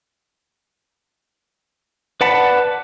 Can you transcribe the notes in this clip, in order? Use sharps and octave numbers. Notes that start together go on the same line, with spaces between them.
B4 D5 F#5 A5 B5